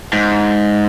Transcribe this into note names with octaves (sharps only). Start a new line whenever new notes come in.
G#2